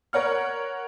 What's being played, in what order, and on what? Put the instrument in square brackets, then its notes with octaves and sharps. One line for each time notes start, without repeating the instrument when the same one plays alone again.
[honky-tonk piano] A#4 C#5 F#5 F6